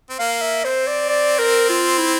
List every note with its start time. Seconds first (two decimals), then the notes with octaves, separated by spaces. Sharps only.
0.10 C4
0.19 A#3 F5
0.41 E5
0.65 C4 C5
0.87 D5
1.09 D5
1.39 A#4
1.69 F4
1.98 E4